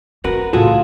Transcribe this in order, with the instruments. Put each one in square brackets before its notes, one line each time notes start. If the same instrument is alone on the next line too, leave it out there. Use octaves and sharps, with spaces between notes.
[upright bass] C#4 [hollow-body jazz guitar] F#4 A#4 B4
[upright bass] A2 C#3 [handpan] F4 [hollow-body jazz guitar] F#4 G#4 A4